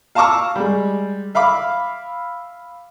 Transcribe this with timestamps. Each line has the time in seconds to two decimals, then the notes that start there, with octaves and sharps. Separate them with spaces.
0.15 F5 A5 A#5 C#6 D6 E6
0.56 G3 G#3
1.35 E5 F5 B5 D6